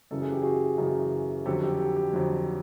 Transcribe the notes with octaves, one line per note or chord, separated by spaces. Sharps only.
F#2 C#3 E3 A4
G#4
G4
F#4 G#4
F#2 C#3 E3
F2 D3 F#3 G4 A4
G4 A4
G4
G4
F2 D3 F#3